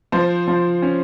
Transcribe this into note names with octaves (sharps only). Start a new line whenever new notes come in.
F3 C5
F3
C#4